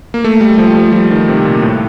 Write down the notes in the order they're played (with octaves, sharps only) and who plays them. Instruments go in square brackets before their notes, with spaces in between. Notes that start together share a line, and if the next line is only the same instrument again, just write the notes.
[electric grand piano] A#3
A3
G3
G3
F3
F3
G3
F3
D#3
C3
A#2
A2